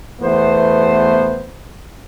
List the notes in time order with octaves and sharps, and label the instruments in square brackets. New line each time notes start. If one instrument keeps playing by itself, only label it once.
[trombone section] E2 A3 B3 C5